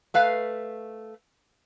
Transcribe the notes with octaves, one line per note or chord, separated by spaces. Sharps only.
A3 B4 F5